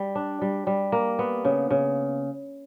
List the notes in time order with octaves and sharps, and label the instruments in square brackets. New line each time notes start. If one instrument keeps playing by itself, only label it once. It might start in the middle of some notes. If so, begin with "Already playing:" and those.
Already playing: [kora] G3
D4
G3
G3
A#3
B3
C#3
C#3